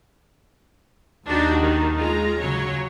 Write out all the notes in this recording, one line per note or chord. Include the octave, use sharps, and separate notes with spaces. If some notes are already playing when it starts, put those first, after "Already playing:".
D#2 D4 D#4 F#4 G4
D#3
G#3 F4 A#5
C#3 F#3 C#5